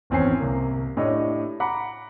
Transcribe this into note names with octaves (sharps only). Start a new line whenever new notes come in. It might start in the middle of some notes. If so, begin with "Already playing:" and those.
G#1 E2 C4 C#4 G#5 C7
C2 A#3
A2 D4 G4 C#5 D#5
F#5 A#5 B5 D6